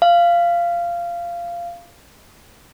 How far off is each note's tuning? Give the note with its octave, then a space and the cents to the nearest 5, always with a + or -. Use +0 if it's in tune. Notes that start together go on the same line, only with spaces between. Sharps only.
F5 -15